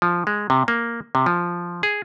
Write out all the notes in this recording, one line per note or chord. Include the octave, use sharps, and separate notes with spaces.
F3
G#3
C3
A#3
C3
F3
G#4